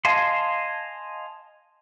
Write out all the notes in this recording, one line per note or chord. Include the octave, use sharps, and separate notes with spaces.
D#5 F5 G#5 A5 C6